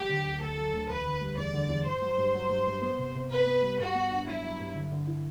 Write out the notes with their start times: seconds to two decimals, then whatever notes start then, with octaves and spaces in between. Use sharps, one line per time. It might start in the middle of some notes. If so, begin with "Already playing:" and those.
Already playing: F#3 G4
0.09 D3
0.25 D2
0.41 D2 A4
0.57 F#3
0.73 D2
0.89 E2 B4
1.05 D3
1.21 G3
1.37 E2 D5
1.54 D3
1.69 E2
1.85 G2 C5
2.02 F#3
2.18 G2
2.35 F#3
2.50 G2
2.67 G2
2.82 B3
2.98 C3
3.15 C3
3.30 C3 B4
3.46 B3
3.63 G3
3.78 G2 F#4
3.94 B3
4.11 D4
4.27 F#3 E4
4.43 F#3
4.59 G2
4.75 D3
4.92 D3
5.07 E4